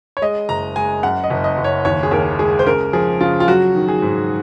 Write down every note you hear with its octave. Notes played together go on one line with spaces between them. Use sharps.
C#5
G#3 D#5
F#1 A#5
G#3 G#5
F#2 F#5
D#5
F#1
D#5
F#1
C#5
D#2 C#5
G#4
D#2 A#4
G#3 G#4
C5
C#3 A#4
F3 G#4
C#3 F4
F4
F#3 F#4
D#3
G#4
G#2